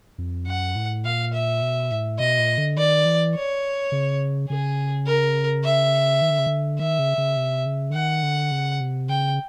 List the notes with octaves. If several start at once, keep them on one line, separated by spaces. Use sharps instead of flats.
F2
F#2 F#5
A2
A#2 F5
E5
B2
A2
B2 D#5
A#2
D3
D#3 D5
E3
C#5
C#3
C#3 G#4
A#4
E5
D#3
D3
C#3
D3
D#3 E5
C#3
C#3
C3
C#3
D3
D#3 F#5
D3
C#3
C3
C#3 G5